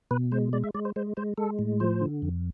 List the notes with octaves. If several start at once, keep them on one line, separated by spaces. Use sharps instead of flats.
B2 B4
G#3 C5
G#3 D5
E5
G#3 D5
C5
G#3 C5
G#3 C5
G#3 A4
A2
F3 C5
D3
F2